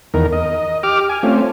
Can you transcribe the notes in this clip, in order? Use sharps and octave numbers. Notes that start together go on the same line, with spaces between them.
E2 D#3 A#4
D#5
G4 D6 F6
G#5
A3 C4 C#4 F4